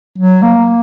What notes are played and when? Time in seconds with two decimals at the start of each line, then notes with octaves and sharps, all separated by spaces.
0.18 F#3
0.42 A#3